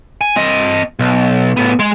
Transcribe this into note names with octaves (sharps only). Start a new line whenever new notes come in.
G#5
C4 D#5
B1
A2 B3
G#3 G#4